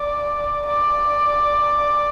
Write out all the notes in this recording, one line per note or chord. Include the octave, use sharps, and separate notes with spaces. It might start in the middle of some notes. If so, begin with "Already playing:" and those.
Already playing: D5
D5